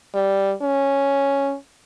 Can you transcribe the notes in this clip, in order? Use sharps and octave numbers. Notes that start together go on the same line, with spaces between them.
G3
C#4